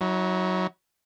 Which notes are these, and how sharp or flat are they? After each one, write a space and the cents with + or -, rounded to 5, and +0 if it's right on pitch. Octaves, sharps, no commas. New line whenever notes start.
F#3 +0 E4 -45